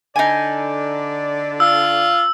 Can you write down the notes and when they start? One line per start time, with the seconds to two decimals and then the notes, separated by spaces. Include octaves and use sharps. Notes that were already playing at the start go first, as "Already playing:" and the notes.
0.16 D3 D#4 D5 G#5
1.60 F4 E6